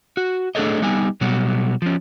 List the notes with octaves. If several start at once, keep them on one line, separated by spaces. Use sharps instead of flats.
F#4
A3 D4 G#4 A4 C#5 D#5
G3 B3 D#4 G#5
B2 F#3 G3 B3 F#4
F3 C#4